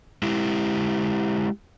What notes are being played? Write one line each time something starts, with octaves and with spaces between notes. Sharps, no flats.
G#3 E4 G4